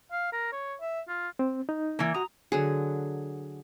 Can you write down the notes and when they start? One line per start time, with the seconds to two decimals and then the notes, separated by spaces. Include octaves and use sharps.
0.12 F5
0.32 A#4
0.52 C#5
0.81 E5
1.08 F4
1.39 C4
1.69 D#4
1.99 E3 A#3
2.14 F#4 A#5 D#6
2.52 D3 F#3 G#4